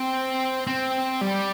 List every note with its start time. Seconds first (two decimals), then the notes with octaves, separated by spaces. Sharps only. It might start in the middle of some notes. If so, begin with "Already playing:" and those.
Already playing: C4
0.67 C4
1.21 G3